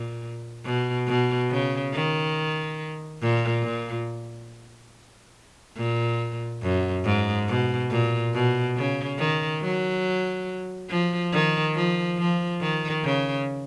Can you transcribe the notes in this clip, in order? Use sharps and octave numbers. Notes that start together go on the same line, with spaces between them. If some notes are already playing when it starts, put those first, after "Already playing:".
Already playing: A#2
B2
B2
C#3
D#3
A#2
A#2
A#2
F#2
G#2
B2
A#2
B2
C#3
D#3
F#3
F3
D#3
F3
F3
D#3
C#3